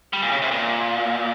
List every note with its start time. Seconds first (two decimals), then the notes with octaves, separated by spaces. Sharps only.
0.13 G3
0.22 A#2
0.32 C#3
0.42 C3
0.51 A#2